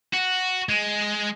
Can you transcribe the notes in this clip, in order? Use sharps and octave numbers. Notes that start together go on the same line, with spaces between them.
F#4
G#3